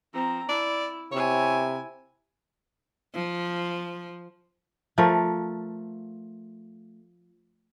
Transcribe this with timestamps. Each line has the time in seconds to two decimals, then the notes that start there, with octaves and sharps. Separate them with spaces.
0.14 F3 C4 A#5
0.49 E4 D5
1.12 C3 E4 C#5 G#5
3.14 F3
4.98 F3 A3 A#4